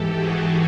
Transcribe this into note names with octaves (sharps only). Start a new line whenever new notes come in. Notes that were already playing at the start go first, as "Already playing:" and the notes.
Already playing: G#2 E3 G4 A4
F#4 G#4